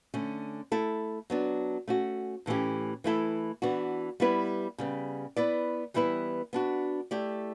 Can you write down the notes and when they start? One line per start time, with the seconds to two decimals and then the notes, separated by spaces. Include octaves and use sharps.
0.14 D3 A3 C#4
0.72 A3 E4 A4
1.30 F#3 B3 D4
1.88 A3 C#4 F#4
2.46 A2 E3 A3 C#4 G4
3.04 E3 A3 E4 A4
3.62 E3 B3 D4 F#4
4.20 G3 B3 E4 B4
4.78 C#3 G3 B3
5.36 B3 E4 B4 D5
5.94 E3 G3 B3 E4 B4
6.53 B3 D4 F#4
7.11 A3 E4 G4 D5